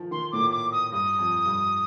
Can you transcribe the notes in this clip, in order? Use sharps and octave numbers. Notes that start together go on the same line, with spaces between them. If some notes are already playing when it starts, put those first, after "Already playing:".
Already playing: D#3 F3
D#3 C6
A2 D6
A#2
D6
D#6
G2 D#6
F2
G2